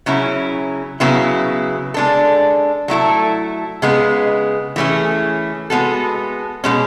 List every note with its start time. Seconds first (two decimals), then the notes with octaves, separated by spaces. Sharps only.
0.06 C#3 F#3 C#4 E4
1.00 C#3 F#3 B3 E4
1.94 G#3 D4 A4
2.88 F#3 A3 E4 A4
3.82 C#3 G#3 B3
4.76 E3 A3 C#4 G#4
5.70 G#3 B3 F#4 A4
6.64 B2 G#3 C#4